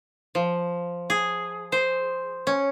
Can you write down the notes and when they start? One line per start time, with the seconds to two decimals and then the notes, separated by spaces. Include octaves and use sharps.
0.35 F3
1.10 G#4
1.72 C5
2.47 C#4